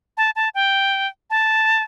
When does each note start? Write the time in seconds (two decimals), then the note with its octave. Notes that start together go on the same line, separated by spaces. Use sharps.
0.17 A5
0.36 A5
0.55 G5
1.30 A5